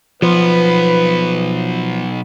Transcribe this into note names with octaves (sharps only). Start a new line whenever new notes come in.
B1 F3 B3 B4